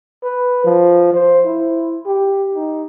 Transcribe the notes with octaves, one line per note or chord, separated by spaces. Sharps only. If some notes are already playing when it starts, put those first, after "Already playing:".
B4
F3
C5
E4
G4
D#4